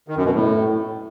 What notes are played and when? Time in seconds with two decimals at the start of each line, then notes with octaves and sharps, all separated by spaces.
0.08 D#3
0.17 F#2
0.25 B2
0.34 A2